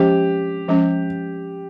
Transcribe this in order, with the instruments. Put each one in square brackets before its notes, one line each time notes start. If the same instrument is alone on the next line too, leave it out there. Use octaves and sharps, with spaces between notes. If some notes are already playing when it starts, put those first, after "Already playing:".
Already playing: [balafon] F3 G#3 C#4 [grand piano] G4
[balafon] F3 G#3 C#4